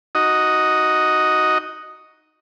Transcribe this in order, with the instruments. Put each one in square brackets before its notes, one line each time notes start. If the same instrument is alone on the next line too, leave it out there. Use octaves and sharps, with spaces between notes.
[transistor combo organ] D#4 F#4 D#5